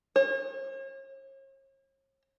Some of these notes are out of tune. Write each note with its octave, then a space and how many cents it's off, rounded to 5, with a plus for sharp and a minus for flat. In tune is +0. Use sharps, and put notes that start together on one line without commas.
C#5 -45